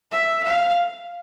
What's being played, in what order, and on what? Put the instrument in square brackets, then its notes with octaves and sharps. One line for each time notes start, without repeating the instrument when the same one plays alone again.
[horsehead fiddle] E5
F5